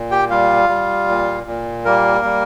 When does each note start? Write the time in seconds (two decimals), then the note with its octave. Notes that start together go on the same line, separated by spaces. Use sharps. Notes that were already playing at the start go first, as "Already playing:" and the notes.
Already playing: A#2
0.11 G4 G5
0.30 G3 F4 F5
0.69 G3
1.08 A#2
1.47 A#2
1.85 G3 A#3 A#4
2.25 G3